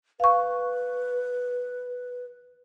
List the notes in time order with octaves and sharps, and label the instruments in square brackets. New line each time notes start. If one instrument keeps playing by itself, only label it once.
[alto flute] B4 [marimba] F5 C#6